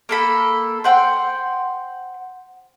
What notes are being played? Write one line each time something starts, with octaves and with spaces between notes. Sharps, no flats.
A#3 A4 B5
C5 F#5 G5 C6